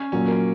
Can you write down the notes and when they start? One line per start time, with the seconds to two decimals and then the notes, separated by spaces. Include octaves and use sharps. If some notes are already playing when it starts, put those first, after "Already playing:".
Already playing: C#4
0.12 A#2 F#3 A#3 C#4
0.28 A#3